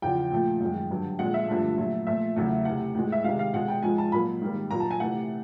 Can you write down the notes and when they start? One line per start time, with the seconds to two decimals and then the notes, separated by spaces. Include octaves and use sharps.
0.02 E2 C#3 F3 G5
0.31 A#2 F3 A3
0.61 F#2 D#3 G#3
0.91 G2 D3 F#3
1.19 A#2 F3 G#3 F#5
1.34 E5
1.48 G2 D3 F3 A3
1.78 A#2 F#3 A3
2.07 A#2 F3 A3 E5
2.36 E2 C#3 F#3 A3
2.65 C3 E3 A3 F#5
2.95 A2 E3 G#3
3.12 E5
3.24 C3 D#3 G#3 F5
3.39 F5
3.53 B2 G#3 F#5
3.68 G5
3.83 G#2 F3 G#3 G#5
3.98 A5
4.12 A#2 F#3 A#3 B5
4.41 G#2 D#3 G3 A#3
4.71 A#2 F#3 A#3 A#5
4.80 A5
4.91 G#5
5.00 C3 E3 A3 F#5